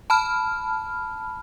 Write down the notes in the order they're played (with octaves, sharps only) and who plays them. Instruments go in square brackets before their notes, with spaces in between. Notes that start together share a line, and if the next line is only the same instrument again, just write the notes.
[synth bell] A5 B5 F6